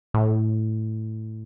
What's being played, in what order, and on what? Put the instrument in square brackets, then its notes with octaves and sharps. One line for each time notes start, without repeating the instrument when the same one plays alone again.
[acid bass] A2